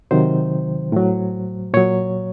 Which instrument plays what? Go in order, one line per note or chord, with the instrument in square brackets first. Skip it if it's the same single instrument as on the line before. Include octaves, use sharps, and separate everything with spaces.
[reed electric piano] C3 D#3 F#3 C5
A2 F#3
A#2 F#3 C#5